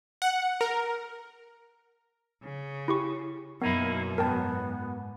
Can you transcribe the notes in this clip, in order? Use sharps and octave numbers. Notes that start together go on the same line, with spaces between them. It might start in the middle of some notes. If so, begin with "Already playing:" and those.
F#5
A#4
C#3
E4 G4 C#6
F#2 B2 A#3 B3 D#4 E4 A#4
G#2 B3 A#4 G5 A5